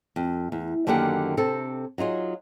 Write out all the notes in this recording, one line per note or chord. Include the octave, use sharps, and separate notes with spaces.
F2
E2
F#2 D3 D#3 A#3 G4 F#5
C3 C4 A4
F#3 D#4 F4 G#4